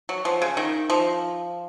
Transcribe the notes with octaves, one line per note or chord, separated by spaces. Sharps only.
F#3
F3
C#3
D#3
F3